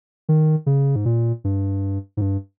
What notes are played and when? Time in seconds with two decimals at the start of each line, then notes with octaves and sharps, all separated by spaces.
0.29 D#3
0.66 C#3
0.96 G#2
1.05 A#2
1.44 G2
2.17 G#2
2.21 G2